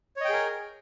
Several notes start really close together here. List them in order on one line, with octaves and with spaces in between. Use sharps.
C#5 D#5 G5 G#4 A#4